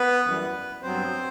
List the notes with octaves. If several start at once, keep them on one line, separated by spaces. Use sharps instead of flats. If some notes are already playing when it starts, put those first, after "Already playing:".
Already playing: B3 B4
F#2 E3 G3 B3
G2 F#3 B3 C4 C5